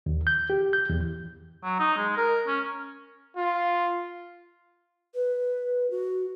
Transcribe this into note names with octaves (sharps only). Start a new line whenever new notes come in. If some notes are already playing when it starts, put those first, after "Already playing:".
D#2
G6
G4
G6
E2
F#3
D#4
G#3
A#4
C#4
F4
B4
F#4